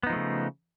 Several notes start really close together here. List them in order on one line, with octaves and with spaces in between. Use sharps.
B3 D#4 F3 A3 C#3